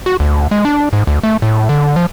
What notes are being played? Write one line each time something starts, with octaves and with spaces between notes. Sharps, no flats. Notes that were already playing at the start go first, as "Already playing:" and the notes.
F#4
D2
G#3
D4
G#2
D2
A3
A2
D3
F3